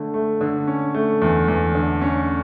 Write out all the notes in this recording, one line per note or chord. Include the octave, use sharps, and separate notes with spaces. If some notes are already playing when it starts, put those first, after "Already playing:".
Already playing: D3 A3
A3
D3
C#4
A3
E2
E2
D3
C#4